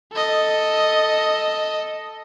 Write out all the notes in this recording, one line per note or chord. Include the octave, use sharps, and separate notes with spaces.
A4 D#5